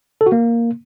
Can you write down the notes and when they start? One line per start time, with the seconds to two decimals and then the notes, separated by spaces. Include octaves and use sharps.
0.21 A4
0.26 F#4
0.32 A#3